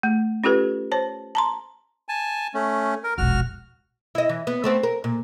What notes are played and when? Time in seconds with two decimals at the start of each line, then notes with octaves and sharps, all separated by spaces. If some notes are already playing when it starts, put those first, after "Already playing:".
0.03 A3
0.44 C#4 F4 G4 A4 B4
0.92 C5 C#5 A5
1.35 A5 A#5 C6
2.09 G#5 A5
2.54 A3 C#4
3.04 A#4
3.18 E1 A#1 F#4 F6
4.15 E4 D#5
4.29 E3
4.47 B3
4.64 A3 B3 C4
4.83 A#4
5.04 A#2